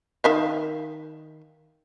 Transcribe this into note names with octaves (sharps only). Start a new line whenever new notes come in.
D#3 E5 F5